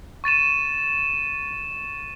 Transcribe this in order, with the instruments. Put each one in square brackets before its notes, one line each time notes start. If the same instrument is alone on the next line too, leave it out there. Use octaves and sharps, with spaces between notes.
[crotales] C#6 A6 D#7 E7